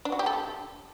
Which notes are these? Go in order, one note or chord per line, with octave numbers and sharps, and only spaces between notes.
D4
F#4
G4
A4
G4